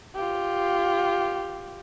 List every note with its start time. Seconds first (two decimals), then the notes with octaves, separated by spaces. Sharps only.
0.15 F4 G4